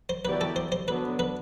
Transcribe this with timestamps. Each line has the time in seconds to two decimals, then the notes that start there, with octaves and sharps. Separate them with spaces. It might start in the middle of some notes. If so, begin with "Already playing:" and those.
0.09 C5
0.25 F#3 B3 E4 G4 B4 D5
0.41 A4
0.56 C5
0.72 C5
0.88 D3 F#3 B3 D4 B4
1.19 B4